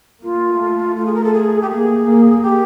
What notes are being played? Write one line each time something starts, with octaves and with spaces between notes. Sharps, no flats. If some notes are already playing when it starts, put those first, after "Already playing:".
A#3 F4
A3
F4
G#4
A#4
A4
G#4
G4
A#3 G#4
A#3
G4